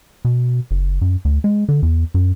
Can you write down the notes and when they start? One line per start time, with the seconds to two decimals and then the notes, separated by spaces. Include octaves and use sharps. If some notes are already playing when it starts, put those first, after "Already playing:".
0.25 B2
0.71 F#1
1.01 F#2
1.25 D2
1.44 G#3
1.69 D3
1.83 E2
2.14 F#2